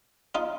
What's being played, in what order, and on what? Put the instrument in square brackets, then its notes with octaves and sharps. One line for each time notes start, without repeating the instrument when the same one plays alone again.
[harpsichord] D#4 F4